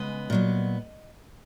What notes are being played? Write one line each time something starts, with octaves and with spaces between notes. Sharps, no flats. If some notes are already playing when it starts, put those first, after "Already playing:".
Already playing: C#3 G#3 B3 D#5
A#2 F#3 B3